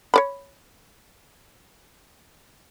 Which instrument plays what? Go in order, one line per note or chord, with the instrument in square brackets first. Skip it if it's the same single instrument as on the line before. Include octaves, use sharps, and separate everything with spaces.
[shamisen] C#5 D5 B5